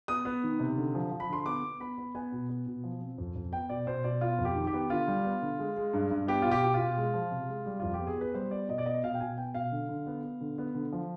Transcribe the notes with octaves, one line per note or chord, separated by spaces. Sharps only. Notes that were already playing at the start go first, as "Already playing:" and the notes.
B3 D#6
B3
D#3
C3
D3
F3
F3
B5
D3 C6
B3 D6
B3
B3 B5
B3
B3 G#5
B2
B3
B2
F3
C4
F2
F2
B3 G5
B2 D5
B2 C5
B2 D5
B3 F4
F2
G4
D#3
G4
B3
D3 F4
G3
B3
D3
G#3
G#3
G2
G2
B3 G4
B2 F4
G4
B2
F4
B2
G#3
F3
C3
G#3
G3
F2 F4
G4
B3
G#4
B3 B4
G3 C5
B3 D5
B2 D#5
D5
B3 D#5
B2 F5
G5
B2 G#5
B3 G5
B2 F5
D3
D3
B3
B3
D3
B3
D3
F3